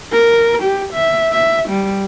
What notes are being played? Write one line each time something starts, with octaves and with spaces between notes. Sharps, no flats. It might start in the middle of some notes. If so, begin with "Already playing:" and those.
A#4
G4
E5
E5
G3